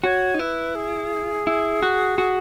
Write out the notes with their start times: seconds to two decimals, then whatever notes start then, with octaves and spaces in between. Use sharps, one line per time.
0.03 F#4 C#5
0.34 D#4
0.39 E4 B4
0.75 G#4
1.47 E4
1.83 F#4
2.18 F#4